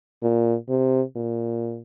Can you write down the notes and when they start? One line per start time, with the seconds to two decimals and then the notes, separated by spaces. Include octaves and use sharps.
0.22 A#2
0.69 C3
1.16 A#2